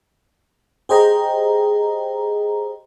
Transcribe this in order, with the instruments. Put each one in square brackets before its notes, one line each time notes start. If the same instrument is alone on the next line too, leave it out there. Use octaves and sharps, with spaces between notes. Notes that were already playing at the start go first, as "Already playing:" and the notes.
[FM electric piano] G4 G#4 C5 D#5 G5 A#5